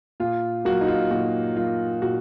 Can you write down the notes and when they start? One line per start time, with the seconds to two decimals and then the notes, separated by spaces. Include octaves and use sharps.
0.20 A#2 F4
0.65 F#3 A#3 F#4
0.81 D#4
0.88 F4
1.11 A#2 F#4
1.57 F#3 A#3 F4
2.02 A#2 F#4